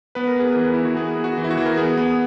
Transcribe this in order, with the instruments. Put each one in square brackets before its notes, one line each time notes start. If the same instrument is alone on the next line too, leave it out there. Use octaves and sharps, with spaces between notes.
[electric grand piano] B3 B4
A#4
B3 G#4
E3 A#4
E3 E4
F#4
B3 G#4
B3
F#4
E3
E4
F#4
E3
A#4
B3 G#4
B3